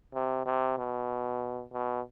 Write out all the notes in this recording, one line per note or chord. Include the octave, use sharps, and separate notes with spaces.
C3
C3
B2
B2